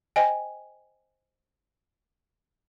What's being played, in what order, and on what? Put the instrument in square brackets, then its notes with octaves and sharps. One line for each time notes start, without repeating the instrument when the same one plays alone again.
[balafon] C5 D#5 G5 G#5